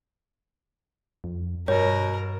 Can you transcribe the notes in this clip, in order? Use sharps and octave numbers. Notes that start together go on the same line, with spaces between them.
F2
G2 B2 A#4 C#5